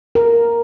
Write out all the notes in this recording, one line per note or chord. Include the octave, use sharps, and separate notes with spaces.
A#4